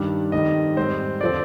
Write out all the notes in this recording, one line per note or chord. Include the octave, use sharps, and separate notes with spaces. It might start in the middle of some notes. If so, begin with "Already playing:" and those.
Already playing: G2 D#3 G3 D4
F2 D#3 G3 D#5
G#2 G3 C4 C5
D3 F3 C4 D5